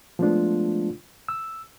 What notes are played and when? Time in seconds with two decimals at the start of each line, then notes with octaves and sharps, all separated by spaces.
0.19 F3 G#3 A3 B3 D4 F4
1.29 E6